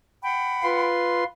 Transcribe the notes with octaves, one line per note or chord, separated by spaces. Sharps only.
F#5 G5 B5
F4 B4 C6